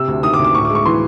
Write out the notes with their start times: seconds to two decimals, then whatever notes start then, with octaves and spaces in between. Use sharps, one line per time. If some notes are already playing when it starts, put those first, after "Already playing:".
Already playing: C3 E6
0.08 D2
0.23 D#3 D#6
0.34 D6
0.39 D2
0.45 D6
0.54 A2 C#6
0.65 D6
0.70 G#3
0.75 C#6
0.86 E3 C6